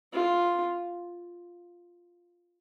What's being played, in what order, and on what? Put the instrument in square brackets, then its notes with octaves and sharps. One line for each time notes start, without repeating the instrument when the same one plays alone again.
[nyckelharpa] F4